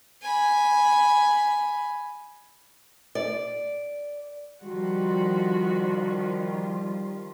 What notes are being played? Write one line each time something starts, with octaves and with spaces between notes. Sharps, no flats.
G#5 B5
D5
D#3 F3 G3 F4 F#4